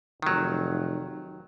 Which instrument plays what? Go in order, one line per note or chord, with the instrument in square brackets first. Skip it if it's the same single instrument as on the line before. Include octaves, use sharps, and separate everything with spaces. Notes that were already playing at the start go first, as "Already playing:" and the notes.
[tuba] F1 [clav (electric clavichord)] D#3 F#3